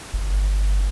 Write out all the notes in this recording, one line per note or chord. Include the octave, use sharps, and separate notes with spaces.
G1